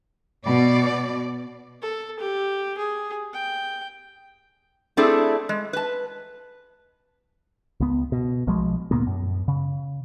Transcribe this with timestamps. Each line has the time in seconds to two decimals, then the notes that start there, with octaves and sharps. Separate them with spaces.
0.45 B2 D5
1.82 A4
2.19 G4
2.77 G#4
3.33 G5
4.97 A3 C4 D4 E4 G#4 A4
5.49 G#3
5.73 B4 A5
7.80 C#2 B3
8.12 B2
8.47 B1 F3 G#3
8.91 D2 A#2 A#3 B3
9.07 F#2
9.48 C#3